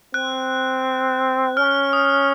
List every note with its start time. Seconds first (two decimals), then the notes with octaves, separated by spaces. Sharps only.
0.14 C4 F#6
1.57 C#4 F6
1.93 D#6